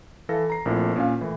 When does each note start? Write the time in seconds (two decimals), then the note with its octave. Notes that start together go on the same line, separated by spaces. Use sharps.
0.29 E3 A4 F5 A#6
0.50 A#5 C7
0.65 A#1 A#2 A3 C4 E4 A#4
0.96 A#2 C#4 F5
1.21 A2 E3